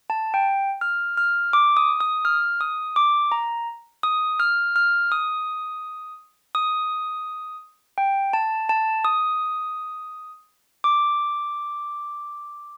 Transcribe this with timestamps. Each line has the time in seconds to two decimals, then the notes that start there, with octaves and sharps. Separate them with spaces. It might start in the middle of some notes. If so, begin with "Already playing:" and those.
0.10 A5
0.34 G5
0.81 F6
1.17 F6
1.53 D6
1.77 D#6
2.01 D#6
2.25 F6
2.61 D#6
2.96 D6
3.32 A#5
4.03 D#6
4.40 F6
4.76 F6
5.12 D#6
6.55 D#6
7.98 G5
8.33 A5
8.69 A5
9.05 D#6
10.84 D6